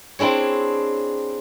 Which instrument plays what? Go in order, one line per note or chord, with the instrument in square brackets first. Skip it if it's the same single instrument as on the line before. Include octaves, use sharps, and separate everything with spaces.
[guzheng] C4 D4 E4 G#4 C#5